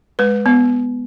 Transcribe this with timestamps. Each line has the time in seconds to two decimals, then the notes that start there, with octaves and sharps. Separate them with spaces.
0.19 G#3 B4
0.46 B3